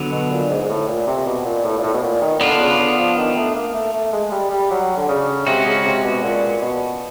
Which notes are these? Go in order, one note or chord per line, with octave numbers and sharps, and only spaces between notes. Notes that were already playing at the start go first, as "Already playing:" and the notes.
Already playing: D3 F#3 B3
B2
A#2
G#2
G#2
A2
A#2
C3
B2
A#2
A2
A#2
A2
B2
A#2
D#3
D3 B3 D4 F4
C#3
D3
F3
D#3
A3
A#3
A3
A3
G#3
G3
G3
F#3
D3
C#3
C3 G#3 C#4 F#4
C#3
C3
B2
A#2
B2